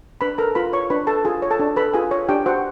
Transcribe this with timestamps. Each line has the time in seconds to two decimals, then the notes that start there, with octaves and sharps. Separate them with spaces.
0.21 D4 B4 B5
0.38 A4 A#4 A#5
0.55 F4 B4 B5
0.73 C#5 C#6
0.90 D4 B4 B5
1.07 A4 A5
1.25 F4 G#4 G#5
1.42 C#5
1.50 A4 A5
1.59 D4
1.76 A4 B4 B5
1.94 F4 G#4 G#5
2.11 C#5
2.29 D4 G4 G5
2.46 F#4 C5 F#5